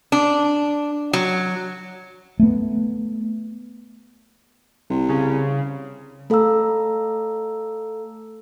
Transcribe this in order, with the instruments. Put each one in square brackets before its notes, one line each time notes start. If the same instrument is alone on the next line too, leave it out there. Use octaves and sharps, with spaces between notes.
[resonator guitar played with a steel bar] D4
F#3
[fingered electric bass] A3 B3
[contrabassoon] C2
[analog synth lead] C#3
[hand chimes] A3 A4 F5 A#5 E6